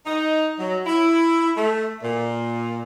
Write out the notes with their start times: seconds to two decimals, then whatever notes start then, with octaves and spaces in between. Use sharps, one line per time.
0.06 D#4
0.58 F#3
0.86 E4
1.57 A3
2.03 A#2